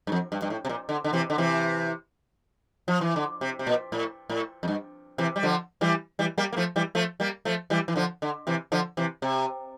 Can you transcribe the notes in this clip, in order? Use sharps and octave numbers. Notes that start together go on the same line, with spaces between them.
G2
F2
G2
G2
A2
C3
A#2
D3
D3
C3 E3
D3
C3 E3
F3
E3
D3
C3
C3
A#2
A2
A2
F2
G2
C3 E3
G3
D3 F3
E3 G3
E3 G3
G3 A#3
A#3
F3 A3
E3 G3
F3 A3
G3 A#3
F3 A3
E3 G3
E3
D3 F3
D3
C3 E3
D3 F3
C3 E3
C3